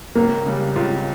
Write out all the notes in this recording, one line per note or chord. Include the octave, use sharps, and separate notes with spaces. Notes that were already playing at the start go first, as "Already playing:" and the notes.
C#2 A#3
C#3 G3
C#2 F4